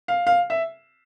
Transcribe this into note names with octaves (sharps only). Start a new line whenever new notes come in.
F5
F5
E5